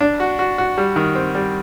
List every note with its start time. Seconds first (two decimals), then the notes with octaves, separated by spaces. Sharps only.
0.01 D4
0.20 F#4
0.39 F#4
0.58 F#4
0.78 G3
0.96 D#3
1.15 C4
1.35 G3